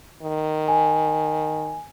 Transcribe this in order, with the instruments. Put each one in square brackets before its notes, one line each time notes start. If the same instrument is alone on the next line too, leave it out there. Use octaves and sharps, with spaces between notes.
[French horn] D#3
[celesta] G#5